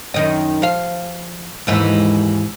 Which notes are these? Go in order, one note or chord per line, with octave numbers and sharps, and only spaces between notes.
F#2 D#3 D#5
F3 F5
D#2 G#2 E3